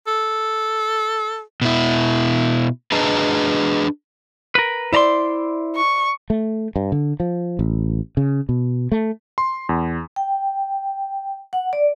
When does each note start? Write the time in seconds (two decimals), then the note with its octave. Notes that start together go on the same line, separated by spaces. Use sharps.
0.07 A4
1.62 B2 E4
2.92 D4 G#4 B4 D#5 A5 A#5
4.55 A#4 B4
4.93 E4 C5 D5 A#5 C6
5.75 C#6
6.30 A3
6.76 G2
6.92 D3
7.20 F3
7.59 A1
8.17 C#3
8.49 B2
8.92 A3
9.38 C6
9.69 E2
10.16 G5
11.53 F#5
11.73 D5